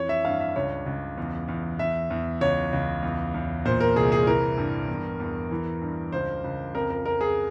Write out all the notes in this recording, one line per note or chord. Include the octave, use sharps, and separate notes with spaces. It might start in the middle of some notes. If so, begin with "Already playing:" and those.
Already playing: F2 E3 C#5
E5
G2 F5
E5
C#2 C#5
C#2
E2
E2
E2 E5
E2
C#2 C#5
C#2
E2
E2
A#2 C5
A#4
C2 G#4
G#4
E3 A#4
G2
E2
E2
E3
G2
C#2 C5
C#2
F2 A#4
A#4
F2 A#4
G#4